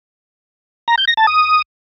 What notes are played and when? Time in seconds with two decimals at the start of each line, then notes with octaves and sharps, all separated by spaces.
0.88 A#5
0.98 G6
1.07 A#6
1.17 A5
1.27 D#6